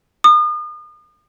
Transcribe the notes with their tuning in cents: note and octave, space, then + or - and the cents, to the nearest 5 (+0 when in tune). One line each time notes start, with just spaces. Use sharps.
D#6 -40